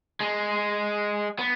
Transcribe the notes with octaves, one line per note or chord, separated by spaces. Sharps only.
G#3
B3